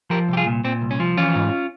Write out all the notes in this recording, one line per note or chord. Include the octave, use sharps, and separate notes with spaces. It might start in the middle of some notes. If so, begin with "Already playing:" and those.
F3 G4 A#4
C2 G4
F4 G#4
A#2
A#2 C4
C2
C#4
F3
E3 C#4 F4
G#2